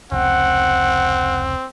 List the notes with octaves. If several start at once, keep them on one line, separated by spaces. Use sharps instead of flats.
F1 C#2 C4 F#5